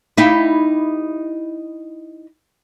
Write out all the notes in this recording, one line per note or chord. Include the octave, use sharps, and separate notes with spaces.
D#4 E4 G4